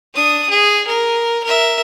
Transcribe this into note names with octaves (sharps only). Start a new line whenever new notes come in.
D4 D#6
G#4
A#4
A#4 E5